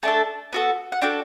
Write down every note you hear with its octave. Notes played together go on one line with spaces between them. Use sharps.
A3 D4 A4 A5
B3 F#4 A4
F#5
D4 F#4 A4 G5